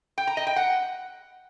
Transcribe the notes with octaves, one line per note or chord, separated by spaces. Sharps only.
G5
A#5
D#5
G5
F#5